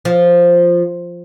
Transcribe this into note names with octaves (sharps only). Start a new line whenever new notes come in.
F3